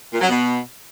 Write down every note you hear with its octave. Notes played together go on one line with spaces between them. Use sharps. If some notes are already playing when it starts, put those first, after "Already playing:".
A#2
F#3
B2